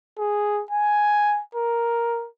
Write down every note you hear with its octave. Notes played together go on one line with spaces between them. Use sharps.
G#4
G#5
A#4